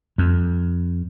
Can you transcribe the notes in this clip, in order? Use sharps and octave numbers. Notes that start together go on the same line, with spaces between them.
F2